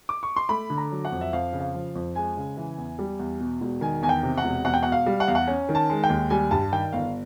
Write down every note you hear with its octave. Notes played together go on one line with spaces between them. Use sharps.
D6
C#6
C6
A3 B5
D3
A#5
F#3
F#5
F2
E5
F2 F5
C#3
F5
F3
F2
G#3 G#5
C#3
E3
E2
G3
E2
B2
E1
D#3 G#5
E2 G#5
G5
C3
F#5
E1
E2 F#5
G5
B2 F#5
F5
G3
F#5
E2 F5
F#5
C#4
D#3
A5
G#3
G5
D#2
G3 G#5
G2 A5
D#3 G5
G1 F5